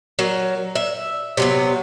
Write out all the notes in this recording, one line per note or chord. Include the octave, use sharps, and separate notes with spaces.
F#3 A#4
E5
C3 F#3 B3